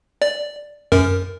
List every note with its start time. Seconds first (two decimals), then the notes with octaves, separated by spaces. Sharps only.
0.22 D5
0.92 F#2 A#4